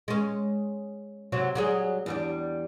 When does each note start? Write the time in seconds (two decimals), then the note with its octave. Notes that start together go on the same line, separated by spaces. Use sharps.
0.08 G#3 C#4
1.32 C3 F#3 F#4
1.55 F#3 G3 G#4
2.06 E2 G3 D4